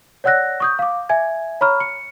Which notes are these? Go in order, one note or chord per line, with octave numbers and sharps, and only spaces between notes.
C#5 D5 F#5 E6 F#6 A#6
C#6 D#6 G6
F5 D6
E5 G#5 G#6
C#5 A#5 B5 C#6 F6
C#7